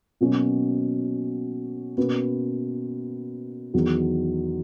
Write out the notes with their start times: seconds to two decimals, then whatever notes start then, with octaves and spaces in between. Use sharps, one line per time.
0.21 B2 F#3 A#3 C#4
1.97 B2 A#3 C#4 F#4 B4
3.74 E2 D#3 F#3